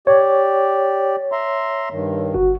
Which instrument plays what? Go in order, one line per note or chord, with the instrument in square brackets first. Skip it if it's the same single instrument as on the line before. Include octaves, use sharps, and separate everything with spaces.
[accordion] G4 D5 [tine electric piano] C#5
[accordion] E5 A#5 C6
G2 D#3
[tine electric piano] G1 F#4